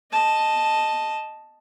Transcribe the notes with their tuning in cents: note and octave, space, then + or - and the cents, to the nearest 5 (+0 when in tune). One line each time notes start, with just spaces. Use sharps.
D#5 +0 A5 +0